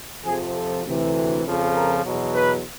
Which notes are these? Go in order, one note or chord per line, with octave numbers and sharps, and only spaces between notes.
F2 C3 F3 G#4
A4
D2 C3 E3
F2 C#3 F3
A#4
E2 B2 F#3
B4